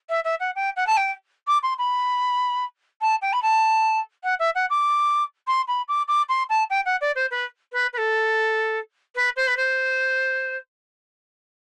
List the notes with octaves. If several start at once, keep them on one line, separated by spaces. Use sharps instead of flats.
E5
E5
F#5
G5
F#5
A5
G5
D6
C6
B5
A5
G5
B5
A5
F#5
E5
F#5
D6
C6
B5
D6
D6
C6
A5
G5
F#5
D5
C5
B4
B4
B4
A4
B4
C5
B4
C5